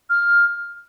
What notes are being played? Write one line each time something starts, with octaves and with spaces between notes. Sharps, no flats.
F6